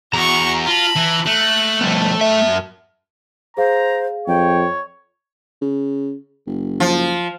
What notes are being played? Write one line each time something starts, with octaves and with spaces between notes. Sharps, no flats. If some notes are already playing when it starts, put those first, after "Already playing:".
E2 F#4 A#5 C#6
F4 A5 B5
E3
A3 F#6
F3 G3 B3 A4
F#2 E5
G#4 C5 F5 A#5
F2 C#5 G5
C#3
F#1
F3